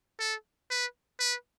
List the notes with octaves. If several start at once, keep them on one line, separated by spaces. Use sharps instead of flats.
A4
B4
B4